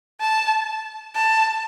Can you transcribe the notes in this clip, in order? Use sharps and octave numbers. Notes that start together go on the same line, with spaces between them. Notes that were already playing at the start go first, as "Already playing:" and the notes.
A5
A5